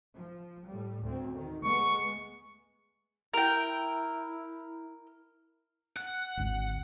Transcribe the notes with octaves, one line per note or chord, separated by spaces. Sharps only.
F3
A2 G3
D2 C4
D#3
G#3 A3 B3 C#6
E4 A#4 G5
F#5
G#1 D2